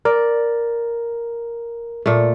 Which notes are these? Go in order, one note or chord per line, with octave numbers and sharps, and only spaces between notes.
A#4 D5
A#2 A3